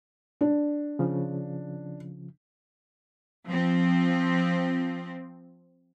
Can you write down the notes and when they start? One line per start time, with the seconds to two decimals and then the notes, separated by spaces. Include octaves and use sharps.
0.41 D4
0.99 C#3 F3
3.46 F3 C4